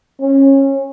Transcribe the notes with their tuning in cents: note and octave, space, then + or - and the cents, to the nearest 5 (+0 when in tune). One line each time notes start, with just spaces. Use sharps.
C#4 -25